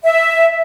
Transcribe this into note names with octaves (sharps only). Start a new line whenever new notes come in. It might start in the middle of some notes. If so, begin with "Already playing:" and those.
E5